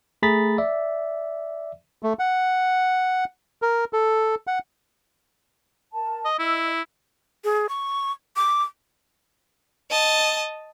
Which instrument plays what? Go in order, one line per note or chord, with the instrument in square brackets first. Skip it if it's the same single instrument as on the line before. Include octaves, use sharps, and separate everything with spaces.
[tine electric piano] A3 G#4 A#5 B5 A6 B6
D5 E5
[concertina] A3
F#5
A#4
A4
F#5
[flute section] A#4 A5
[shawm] D#5
[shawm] E4 [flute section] D#5 E6
[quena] G#4
C#6
D6
[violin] D#5 A5